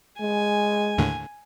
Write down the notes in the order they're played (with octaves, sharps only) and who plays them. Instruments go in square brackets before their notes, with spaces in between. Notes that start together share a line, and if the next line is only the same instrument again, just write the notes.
[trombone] G#3 [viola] G#5
[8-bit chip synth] D#2 A2 D3